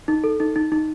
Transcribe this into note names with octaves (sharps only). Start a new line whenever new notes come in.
D#4
A4
D#4
D#4
D#4